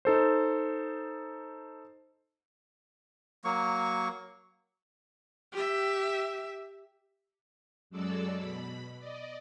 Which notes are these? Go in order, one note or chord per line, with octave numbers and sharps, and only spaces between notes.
D#4 A4 C5
F#3 A#3 C#6
G4 E5
F#2 F#3 G#3 A4 D5 E6
B2 B5
D5 D#5